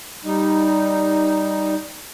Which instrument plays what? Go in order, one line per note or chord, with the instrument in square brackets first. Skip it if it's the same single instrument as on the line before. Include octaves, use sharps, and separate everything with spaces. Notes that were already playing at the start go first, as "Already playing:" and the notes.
[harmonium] G3 D#4